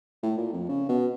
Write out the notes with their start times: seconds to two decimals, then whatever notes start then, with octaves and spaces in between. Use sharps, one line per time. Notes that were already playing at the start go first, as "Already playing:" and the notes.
0.23 A2
0.38 A#2
0.53 F2
0.69 C#3
0.89 B2